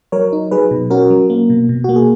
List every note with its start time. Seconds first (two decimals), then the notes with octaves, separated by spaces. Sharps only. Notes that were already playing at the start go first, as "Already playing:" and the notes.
0.12 F#3 A#4 C#5
0.33 D#4
0.51 F#3 G#4 B4
0.71 B2
0.90 C#4 F#4 A#4
1.10 F#3
1.30 A#3
1.50 B2
1.69 B2
1.84 A#3 F#4
1.96 G#4